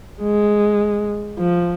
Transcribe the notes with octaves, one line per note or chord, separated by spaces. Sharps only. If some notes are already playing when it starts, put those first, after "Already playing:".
G#3
F3